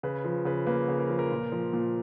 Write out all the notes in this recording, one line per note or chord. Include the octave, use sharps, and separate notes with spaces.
C#3 B4
F3
C#3 B4
A#3 B4
C#3
A#4
F3
A#4
A#2
F3
A#2